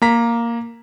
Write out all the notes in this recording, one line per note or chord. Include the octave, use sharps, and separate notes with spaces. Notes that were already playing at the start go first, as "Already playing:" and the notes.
A#3 A#5 B6